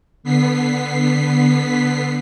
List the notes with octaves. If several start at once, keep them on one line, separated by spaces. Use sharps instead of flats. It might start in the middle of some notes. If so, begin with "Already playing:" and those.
D3 B3 B6 C7